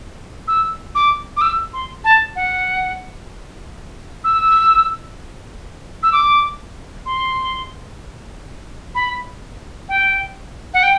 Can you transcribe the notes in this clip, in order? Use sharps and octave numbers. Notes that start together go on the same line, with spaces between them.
E6
D6
D6
E6
C6
A5
F#5
E6
E6
D6
C6
B5
G5
F#5
G5